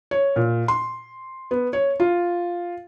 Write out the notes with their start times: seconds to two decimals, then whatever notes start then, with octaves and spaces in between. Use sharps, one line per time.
0.11 C#5
0.36 A#2
0.68 C6
1.51 B3
1.73 C#5
2.00 F4